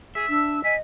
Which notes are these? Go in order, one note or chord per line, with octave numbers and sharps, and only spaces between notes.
G#4 E5
D4 E6
D#5 G#5 B6